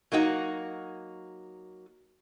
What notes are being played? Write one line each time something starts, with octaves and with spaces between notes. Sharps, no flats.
F#3 A#3 D#4 F#4